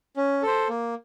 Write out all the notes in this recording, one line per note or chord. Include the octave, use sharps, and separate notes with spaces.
C#4
A4 C5
A#3